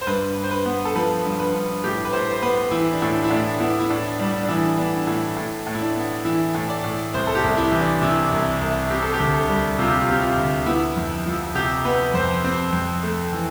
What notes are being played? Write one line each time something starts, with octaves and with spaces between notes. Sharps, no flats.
C5
G2 B4
G2
C5
B4
B3
A4
F3 B4
G2
B4
G2
A2 G4
B4
A2 C5
C5
B3 B4
E3 E4
D4
A2 E4
E4
A2 D4
B3 E4
E4
A2 D4
G3 D4
D4
E3 E4
B3 D4
A2 E4
A2
A2
E4
D4
B3
E3 E4
A2
D5
A2
C2 C5
A4
G4
C2
E4
E3
D4
C3 E4
C2
C2
C4 G4
A4
G4
D2
A4
G3
C3 F4
G4
F4
C4 G4
F4
D2
B3 E4
F2
F3
C3 G4
B3 B4
F2 C5
C4
F2
A3
E3